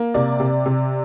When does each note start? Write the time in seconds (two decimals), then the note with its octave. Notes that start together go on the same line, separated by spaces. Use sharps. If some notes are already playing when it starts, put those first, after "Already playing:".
Already playing: A#3
0.14 C3 D5
0.40 C3
0.66 C3